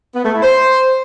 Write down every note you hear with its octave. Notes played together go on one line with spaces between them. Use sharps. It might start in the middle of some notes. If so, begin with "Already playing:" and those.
B3
A3
E4
C5